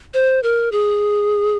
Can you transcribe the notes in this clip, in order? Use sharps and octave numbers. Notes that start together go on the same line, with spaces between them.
C5
A#4
G#4